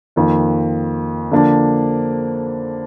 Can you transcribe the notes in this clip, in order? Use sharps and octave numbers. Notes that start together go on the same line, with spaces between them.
F2 D#3 A#3 F4
D3 F3 A#3 D4